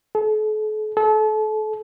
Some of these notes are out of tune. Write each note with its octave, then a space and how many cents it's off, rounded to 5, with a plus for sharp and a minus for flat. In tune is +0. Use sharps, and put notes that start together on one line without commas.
A4 -45
A4 -35